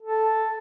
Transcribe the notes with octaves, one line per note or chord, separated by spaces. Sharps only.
A4